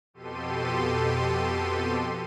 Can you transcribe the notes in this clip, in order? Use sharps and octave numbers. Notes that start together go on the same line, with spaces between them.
F2 B2 G4 A4 C6 D#7